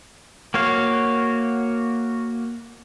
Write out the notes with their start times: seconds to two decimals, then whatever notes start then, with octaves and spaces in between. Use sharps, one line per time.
0.54 A#3 F#4 C#5 F5